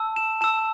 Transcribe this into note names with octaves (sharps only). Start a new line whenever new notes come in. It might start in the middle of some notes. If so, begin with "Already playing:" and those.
Already playing: A5 E6
E7
A5 E6 E7